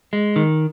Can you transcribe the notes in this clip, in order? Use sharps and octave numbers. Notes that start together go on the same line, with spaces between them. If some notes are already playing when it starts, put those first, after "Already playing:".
G#3
D#3